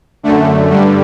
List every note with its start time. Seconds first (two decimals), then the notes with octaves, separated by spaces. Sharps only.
0.23 F#2 D3 A3
0.71 G2 D3 G3